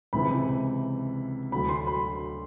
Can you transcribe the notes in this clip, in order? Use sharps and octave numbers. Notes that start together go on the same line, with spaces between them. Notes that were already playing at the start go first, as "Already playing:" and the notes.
C#2 C3 E3 B5
D2 D3 F#3 B5
C6
B5